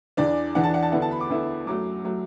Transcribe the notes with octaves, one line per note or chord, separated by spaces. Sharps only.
E2 E3 D4 D5
E2 E3 D4 F#5
A5
F#5
A5
D2 D3 B3 E4 F#5
A5
B5
D6
D2 D3 B3 E4
F#2 F#3 A3 D6
F#3 A3